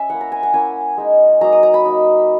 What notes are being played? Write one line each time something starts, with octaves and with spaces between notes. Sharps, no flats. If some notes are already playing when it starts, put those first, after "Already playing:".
Already playing: C#4 E5
A#3 E4 F#5
A#5
G#5
F#5
A#3 C#4 E4 G#5
G#3 D#4
F#3 A#3 D#4 A#5
D#6
A#5
B5
A#3 D#4